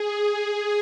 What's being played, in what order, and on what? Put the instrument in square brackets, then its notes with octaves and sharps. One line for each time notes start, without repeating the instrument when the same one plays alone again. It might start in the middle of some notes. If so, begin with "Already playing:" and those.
Already playing: [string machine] G#4